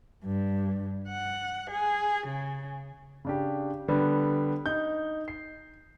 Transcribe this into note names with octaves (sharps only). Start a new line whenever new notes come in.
G2
F#5
G#4
C#3
C#3 D4 G4
D3 G3 B3
D#4 G6
C7